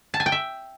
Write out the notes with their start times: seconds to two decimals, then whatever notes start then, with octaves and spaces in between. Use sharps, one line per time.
0.14 A5
0.20 G#5
0.26 G5
0.32 E5